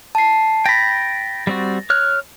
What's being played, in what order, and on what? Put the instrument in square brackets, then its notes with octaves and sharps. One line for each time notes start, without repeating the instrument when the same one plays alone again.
[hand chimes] A5 C7
[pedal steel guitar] G5 B5 [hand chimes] A6 A#6
[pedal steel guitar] G3 C4 F#4
C#5 F6 F#6